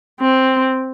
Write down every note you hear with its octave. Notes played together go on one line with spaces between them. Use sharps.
C4